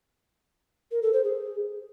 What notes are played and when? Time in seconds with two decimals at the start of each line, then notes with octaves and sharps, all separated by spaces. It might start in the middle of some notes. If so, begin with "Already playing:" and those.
0.91 A#4
1.02 A4
1.13 C5
1.24 G#4